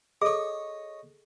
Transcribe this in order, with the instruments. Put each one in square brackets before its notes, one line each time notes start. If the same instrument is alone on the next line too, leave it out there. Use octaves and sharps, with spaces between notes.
[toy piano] G#4 A4 [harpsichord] C#5 D#5